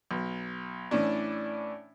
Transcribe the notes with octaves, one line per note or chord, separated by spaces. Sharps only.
B1
A2 E3 C#4 D4